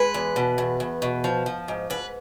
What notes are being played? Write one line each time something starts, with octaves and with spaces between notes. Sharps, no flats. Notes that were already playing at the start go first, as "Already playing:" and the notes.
Already playing: G#3 B4
E2
B2
E2
E2
B2
F3
F3
G#2
G#2 B4